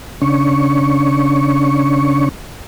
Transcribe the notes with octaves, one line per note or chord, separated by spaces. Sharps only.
C#3 C#4 D4 C#6